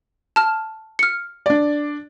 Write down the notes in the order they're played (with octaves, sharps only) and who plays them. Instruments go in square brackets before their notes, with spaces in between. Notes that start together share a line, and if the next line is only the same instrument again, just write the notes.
[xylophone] A5 F6
F6 C#7
[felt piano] D4 D5